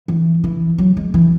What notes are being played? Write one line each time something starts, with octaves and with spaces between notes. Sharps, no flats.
E3
E3
F#3
G#3
E3